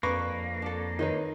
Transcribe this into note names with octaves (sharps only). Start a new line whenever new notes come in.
F2 A#3 D4 B4 C#6
D4 A4
D#3 B4 C#5 D#5